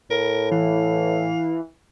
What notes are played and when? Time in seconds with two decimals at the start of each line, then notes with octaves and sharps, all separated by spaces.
0.10 A2 A#4
0.51 E3 F5